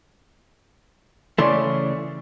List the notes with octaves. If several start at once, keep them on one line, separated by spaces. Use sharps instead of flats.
C#3 E3 A3 C#4 D5 C6